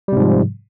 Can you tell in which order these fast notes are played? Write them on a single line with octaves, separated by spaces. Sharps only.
G3 C3 G#2 F3